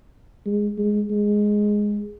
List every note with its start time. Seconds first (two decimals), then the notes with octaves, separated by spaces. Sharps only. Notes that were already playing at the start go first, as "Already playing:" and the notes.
0.46 G#3
0.78 G#3
1.10 G#3